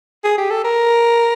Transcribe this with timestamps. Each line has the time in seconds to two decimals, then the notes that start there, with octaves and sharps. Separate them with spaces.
0.24 G#4
0.38 G4
0.50 A4
0.64 A#4